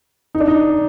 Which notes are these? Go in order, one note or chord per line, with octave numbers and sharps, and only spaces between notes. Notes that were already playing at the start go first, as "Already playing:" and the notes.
D#4
D4
D#4